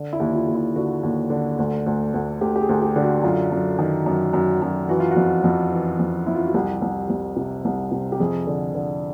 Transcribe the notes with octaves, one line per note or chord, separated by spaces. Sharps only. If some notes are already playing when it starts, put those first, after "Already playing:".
Already playing: D3
E4
D#2
F4
D#2
E4
D3 F#4
D#2
D3
D2
D2
D2
D2 G4
G4
G#4
D2
G4
D3
F#4
F#2 F4
F#2
D#3
F#2
F#2
F#2
E3 F#4
F4
F#4
F2
F2
E3
F2
F2 E4
F4
F#4
C2 G4
C2
C2
C3
C2
C3
G4
F2 G#4
D3
D3